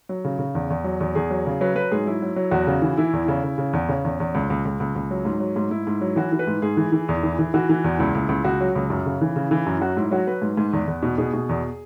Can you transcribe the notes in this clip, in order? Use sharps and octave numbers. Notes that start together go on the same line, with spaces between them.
F#3
C#3
C#3
E2
E2
F#3
E2
E2 G#4
F#3
C#3
F#3 B4
F#3 B4
G#2 G#4
F#3 E4
F#3
F#3
E2 F#4
C#3
E3
E3 E4
E2
C#3
C#3
C#3
E2
C#3 C#4
E2
E2
C#2
C#2
C#2
C#2
C#2
F#3
G#2
F#3
G#2
G#2 E4
G#2
F#3
E3 F#4
E3
B4
G#2
G#2 G#4
E3
E3
E2
E3
E3
E3 F#4
E3
E2
C#2 E4
C#2
C#2
C#2 F#4
F#3
C#2
F#2
C#3
E3
C#3
E3
F#2
F#3 F#4
G#2 E4
F#3 F#4
F#3 B4
G#2
G#2
E2
E2
B2
B2 G#4
B2
E2